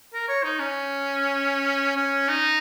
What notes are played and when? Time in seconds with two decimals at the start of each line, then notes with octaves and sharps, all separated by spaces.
0.14 A#4
0.28 C#5
0.44 D#4
0.59 C#4
1.97 C#4
2.28 D#4